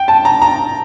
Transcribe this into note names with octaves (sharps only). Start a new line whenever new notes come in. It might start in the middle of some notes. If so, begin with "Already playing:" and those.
Already playing: G5
A5
A#5
A#5